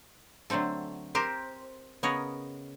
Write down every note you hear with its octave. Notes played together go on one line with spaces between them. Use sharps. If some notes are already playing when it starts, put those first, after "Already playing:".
D3 F#3 A3 C4 A4
C4 G4 A#4 C5
C#3 B3 A#4 C#5 D#5